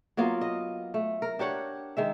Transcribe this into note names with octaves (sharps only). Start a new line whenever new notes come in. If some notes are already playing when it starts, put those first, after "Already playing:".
F#3 A#3 B3 F4
D#5
A3
A#4
D4 G4 C#5 F#5
D#3 G#3 E5